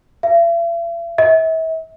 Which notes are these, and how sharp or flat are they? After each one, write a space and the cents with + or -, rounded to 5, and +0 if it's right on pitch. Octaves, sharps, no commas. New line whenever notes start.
E5 +45
E5 -35